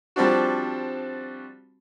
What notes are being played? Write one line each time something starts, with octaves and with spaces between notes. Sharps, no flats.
F3 G3 C4 D4 F#4